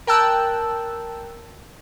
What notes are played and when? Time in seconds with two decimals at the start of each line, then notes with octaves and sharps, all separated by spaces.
0.07 A#4 G5 A5 E6 F#6